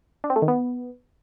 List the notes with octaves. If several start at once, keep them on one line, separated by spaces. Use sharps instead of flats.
D4
C4
A3
D#3
B3